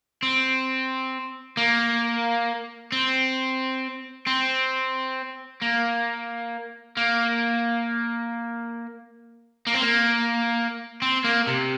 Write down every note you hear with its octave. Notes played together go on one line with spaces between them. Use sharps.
C4
A#3
C4
C4
A#3
A#3
A#3
C4
A#3
C4
A#3
C3